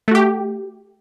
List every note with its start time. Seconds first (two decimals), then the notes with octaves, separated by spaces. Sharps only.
0.08 A3
0.11 F#4
0.15 G4